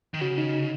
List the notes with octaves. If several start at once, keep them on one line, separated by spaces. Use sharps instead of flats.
D#3
C#3 F#4
D#4
D#4